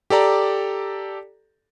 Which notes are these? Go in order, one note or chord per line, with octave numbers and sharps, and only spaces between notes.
G4 A4 D5 A#5